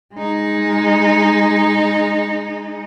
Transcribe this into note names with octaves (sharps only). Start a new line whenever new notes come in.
G#3 D#4